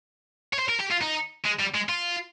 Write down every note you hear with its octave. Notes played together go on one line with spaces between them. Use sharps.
C#5
C5
A#4
G4
F4
D#4
G#3
G3
G#3
F4